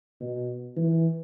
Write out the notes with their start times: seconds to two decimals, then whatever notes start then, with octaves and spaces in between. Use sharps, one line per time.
0.20 B2
0.77 E3